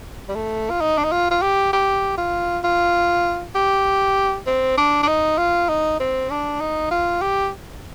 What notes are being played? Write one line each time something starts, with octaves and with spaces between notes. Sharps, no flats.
G3
A3
F4
D#4
D4
D#4
F4
F4
G4
G4
F4
F4
G4
C4
D4
D4
D#4
F4
D#4
C4
D4
D#4
F4
G4